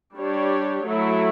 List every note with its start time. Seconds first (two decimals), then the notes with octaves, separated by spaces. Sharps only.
0.15 G3 D4 G4 C#5
0.84 F#3 A3 E4